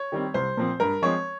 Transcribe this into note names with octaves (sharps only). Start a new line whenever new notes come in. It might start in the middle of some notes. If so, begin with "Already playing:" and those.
Already playing: C#5
D#3 G3 C4
C2 C5
A#2 F3 C4
G2 A#4
F3 G#3 C4 C#5